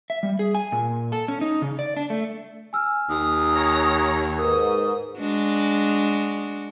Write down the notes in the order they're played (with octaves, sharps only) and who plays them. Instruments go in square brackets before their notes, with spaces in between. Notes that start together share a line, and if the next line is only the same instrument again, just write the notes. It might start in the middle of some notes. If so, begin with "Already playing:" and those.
[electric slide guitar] E5
G3
G#4
G#5
A#2
A4
C#4
D#4
C#3
D5
D4
A3
[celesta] G#5 E6 F6
[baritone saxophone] D#2 [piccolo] D#6
[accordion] C#5 A#5
[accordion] G#2 [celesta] A#4 B4 [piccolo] D#6
[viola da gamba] G#3 D4 F#4